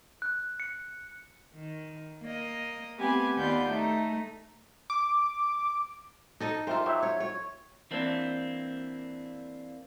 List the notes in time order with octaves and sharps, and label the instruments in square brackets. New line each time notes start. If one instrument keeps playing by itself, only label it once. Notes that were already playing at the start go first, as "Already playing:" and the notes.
[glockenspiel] F#6
C#7
[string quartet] D#3
A#3 D#5
A3 B3 C4 G4 B4 G#5
D#2 B3 F4 D5 G6
A3 D#4
[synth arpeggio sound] D6
[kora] D#4 A4 D#5
[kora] F4 C5 [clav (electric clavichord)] G4 A#4 E5
[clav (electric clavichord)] F#3 G4 E5
[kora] C#5
C#5
[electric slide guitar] E3 A#3 C4 D4